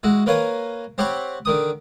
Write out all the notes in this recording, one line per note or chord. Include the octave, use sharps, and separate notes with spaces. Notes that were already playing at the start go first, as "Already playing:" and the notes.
G#3 E4 F#4
A#3 A#4 B4 C#5 F5 G#5
C4 G4 C#5 F#5 B5 C#6
D3 D#3 D#6